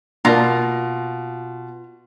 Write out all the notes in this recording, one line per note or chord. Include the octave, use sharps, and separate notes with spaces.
B2 A#3 D4 F4 A#5